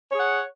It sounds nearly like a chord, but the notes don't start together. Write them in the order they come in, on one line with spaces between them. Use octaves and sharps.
C#5 G#4 F#5